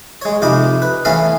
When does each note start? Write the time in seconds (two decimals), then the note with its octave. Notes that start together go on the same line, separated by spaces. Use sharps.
0.22 G#3 C#5
0.42 F2 C3 D#4 B5 D6
0.82 B4
1.05 E3 A3 B3 C#4 F5 B5